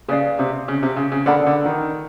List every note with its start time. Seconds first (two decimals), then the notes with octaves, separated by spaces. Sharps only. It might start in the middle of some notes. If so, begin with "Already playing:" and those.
0.08 C#3 B4 D5 F5
0.39 C3
0.68 C#3
0.83 C3
0.96 C#3
1.12 C#3
1.26 D3 A#4 D5 F#5 B5
1.46 D3
1.65 D#3